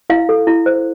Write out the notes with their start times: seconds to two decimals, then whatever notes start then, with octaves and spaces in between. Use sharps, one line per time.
0.10 E4 F5
0.29 A4
0.47 E4
0.66 C5